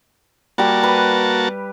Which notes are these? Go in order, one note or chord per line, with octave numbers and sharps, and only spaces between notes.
G3 A#3 F#4 G4 A5
B4